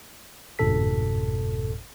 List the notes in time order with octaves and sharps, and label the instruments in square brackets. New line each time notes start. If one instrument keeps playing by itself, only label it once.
[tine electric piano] G1 F2 G#2 B2 A4 B6